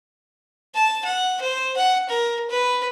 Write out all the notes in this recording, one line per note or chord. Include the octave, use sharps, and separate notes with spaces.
A5
F#5
C5
F#5
A#4
B4